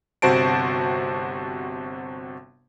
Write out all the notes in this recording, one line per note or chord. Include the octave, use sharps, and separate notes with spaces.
G1 C3 F#4 C5 A5 D7